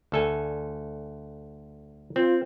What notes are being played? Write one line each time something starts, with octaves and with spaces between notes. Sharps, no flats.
D2 A4 G#5
C4 F4